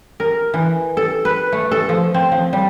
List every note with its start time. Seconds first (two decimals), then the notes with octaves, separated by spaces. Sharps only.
0.20 A#4
0.54 E3
0.97 A4
1.25 B4
1.52 A3
1.71 A4
1.89 F3
2.14 C4
2.32 F3
2.53 G3